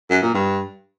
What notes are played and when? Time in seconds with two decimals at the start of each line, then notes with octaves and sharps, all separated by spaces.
0.10 F#2
0.22 A#2
0.34 G2